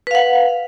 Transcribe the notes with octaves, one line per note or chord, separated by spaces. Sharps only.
B4 F5 F#5